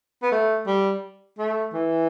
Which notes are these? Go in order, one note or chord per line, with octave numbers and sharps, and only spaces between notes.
B3
A3
G3
A3
E3